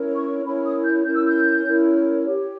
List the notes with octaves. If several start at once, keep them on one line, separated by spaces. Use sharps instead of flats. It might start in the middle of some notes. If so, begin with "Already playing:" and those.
Already playing: C#4 E4 A#4 C#5
C#6
C#4 E4 A#4 C#5 B5
D#6
G6
C#4 E4 A#4 C#5 G6
E6
G6
C#4 E4 A#4 C#5
G4 C#5